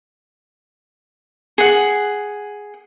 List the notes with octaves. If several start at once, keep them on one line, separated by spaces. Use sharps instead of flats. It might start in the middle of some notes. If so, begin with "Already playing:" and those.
G#4 F#5